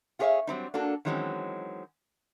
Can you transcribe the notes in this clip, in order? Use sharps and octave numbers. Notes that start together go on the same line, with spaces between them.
F4 F#4 G#4 C#5 E5 F5
F#3 G3 C4 D#4
A#3 D4 F#4 A4
D#3 E3 F#3 G#3 C4 C#4